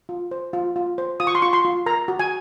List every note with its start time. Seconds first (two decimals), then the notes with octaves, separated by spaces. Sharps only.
0.09 F4
0.31 C5
0.53 F4
0.76 F4
0.98 C5
1.20 F4 D#6
1.27 C#6
1.35 C6
1.42 F4 C#6
1.53 C6
1.65 F4
1.86 A#4 A#5
2.08 F#4
2.19 G#5